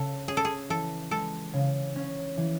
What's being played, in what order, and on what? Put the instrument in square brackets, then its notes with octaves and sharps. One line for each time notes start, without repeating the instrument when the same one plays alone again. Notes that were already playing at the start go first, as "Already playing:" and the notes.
Already playing: [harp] C#3 [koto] A4
[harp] C#4 [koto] G#4
[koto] A4
G#4
[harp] E3 [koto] A4
[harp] G#3 [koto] A4
[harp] C#3
C#4
E3